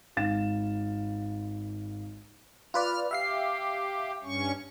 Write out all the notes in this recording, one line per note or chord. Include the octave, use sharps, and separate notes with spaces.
G#1 F5 A6 E7
F4 B4 D5 F6
G4 E5 F5 C7
G2 C#4 C#6